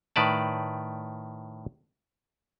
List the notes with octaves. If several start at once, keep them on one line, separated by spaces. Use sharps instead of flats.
A2 D#3 B4 D5 A5